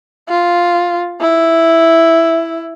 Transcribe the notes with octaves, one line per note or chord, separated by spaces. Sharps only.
F4
E4